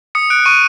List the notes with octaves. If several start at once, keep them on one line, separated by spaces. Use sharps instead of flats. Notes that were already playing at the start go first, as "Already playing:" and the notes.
D#6 C#7
F#6 D7
C#6 D#7